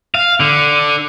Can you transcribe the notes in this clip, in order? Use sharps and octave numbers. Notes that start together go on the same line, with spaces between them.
F5
D3